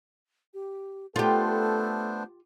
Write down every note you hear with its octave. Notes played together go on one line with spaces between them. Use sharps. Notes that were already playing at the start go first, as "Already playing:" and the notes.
G4
A3 B3 D4 F4 G4 A4 C5